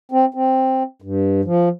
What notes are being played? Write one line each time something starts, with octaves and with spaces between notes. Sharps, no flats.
C4
C4
G2
F3